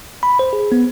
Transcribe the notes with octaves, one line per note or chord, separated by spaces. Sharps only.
B5
C5
G#4
B3